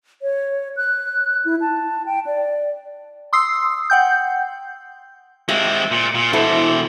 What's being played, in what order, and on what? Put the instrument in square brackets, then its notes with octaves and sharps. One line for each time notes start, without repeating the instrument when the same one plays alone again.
[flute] C#5
F#6
E4
A5
G5
D5
[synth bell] C6 D#6 E6 C7
F#5 G5 G6
[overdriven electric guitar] G#3 C4 [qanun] G4 E5 F5
[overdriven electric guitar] A#2
A#2
[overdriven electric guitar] B2 E3 [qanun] E4 A4 C5